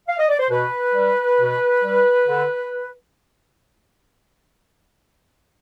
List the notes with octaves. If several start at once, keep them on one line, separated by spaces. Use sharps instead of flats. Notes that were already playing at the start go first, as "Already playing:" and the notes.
F5
D#5
D5
C5
B2 B4
G3
B2
G3
D3